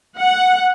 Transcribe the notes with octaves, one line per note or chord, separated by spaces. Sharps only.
F#5